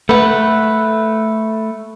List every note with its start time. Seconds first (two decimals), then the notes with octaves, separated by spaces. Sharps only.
0.09 A3 B4 F#5